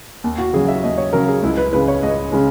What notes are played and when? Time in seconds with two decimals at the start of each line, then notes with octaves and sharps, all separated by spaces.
0.24 D#2
0.38 F#4
0.53 C#3 F#3 G#4
0.68 E5
0.84 D#2 D#5
0.98 C#5
1.12 C#3 F#3 A#4
1.28 G#4
1.43 C#2 E4
1.57 B4
1.73 C#3 G#3 B4
1.88 C#5
2.03 C#2 D#5
2.32 C#3 G#3